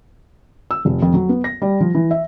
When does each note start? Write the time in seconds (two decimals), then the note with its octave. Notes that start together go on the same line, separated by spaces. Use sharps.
0.71 E6
0.85 F1
1.02 F2
1.14 F#3
1.29 B3
1.44 A#6
1.62 G3
1.80 F3
1.95 E3
2.11 E5